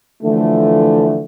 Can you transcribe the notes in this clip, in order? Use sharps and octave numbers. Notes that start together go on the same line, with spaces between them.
D3 E3 F3 A3